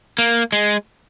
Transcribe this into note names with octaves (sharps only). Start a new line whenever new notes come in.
A#3
G#3